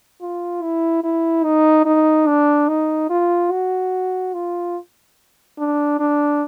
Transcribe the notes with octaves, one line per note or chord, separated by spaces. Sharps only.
F4
E4
E4
D#4
D#4
D4
D#4
F4
F#4
F4
D4
D4